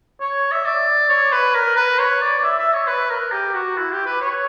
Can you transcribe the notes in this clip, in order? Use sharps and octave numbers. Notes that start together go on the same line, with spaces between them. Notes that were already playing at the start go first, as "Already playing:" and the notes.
C#5
E5
D5
C#5
B4
A#4
B4
C#5
D5
D5
E5
E5
C#5
B4
A#4
G4
F#4
E4
G4
B4
C#5